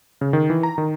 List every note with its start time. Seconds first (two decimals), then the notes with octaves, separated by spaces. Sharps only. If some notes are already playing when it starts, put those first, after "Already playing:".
0.21 C#3
0.33 D#3
0.50 E3
0.63 A#5
0.78 D#3